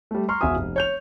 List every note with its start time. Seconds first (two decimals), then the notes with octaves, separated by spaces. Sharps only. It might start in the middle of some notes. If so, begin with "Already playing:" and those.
0.11 G3 A3
0.28 A#5 C6 C#6 F6
0.41 E1 F#4 E5 G#5 D#6
0.56 F1
0.76 C#5 G6 F7